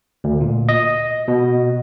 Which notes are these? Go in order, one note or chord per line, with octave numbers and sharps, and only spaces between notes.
D2
A#2
D#5
B2